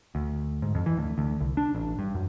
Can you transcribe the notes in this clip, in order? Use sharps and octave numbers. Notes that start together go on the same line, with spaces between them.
D2
G#2
F2
E3
D2
D2
C2
D4
A1
G2
F#2